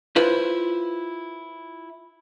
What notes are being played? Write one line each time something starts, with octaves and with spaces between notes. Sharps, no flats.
E4 F4 B4 C5